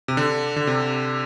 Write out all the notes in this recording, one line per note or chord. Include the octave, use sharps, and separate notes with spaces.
C3
D3
D3
C3